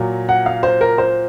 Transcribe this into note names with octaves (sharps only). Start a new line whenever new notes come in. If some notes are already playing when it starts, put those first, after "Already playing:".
Already playing: A#2 F#3
F#5
F5
C5
A#4
C5